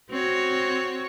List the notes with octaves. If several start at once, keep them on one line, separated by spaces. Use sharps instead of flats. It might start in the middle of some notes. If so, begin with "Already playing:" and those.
C4 F#4 C#5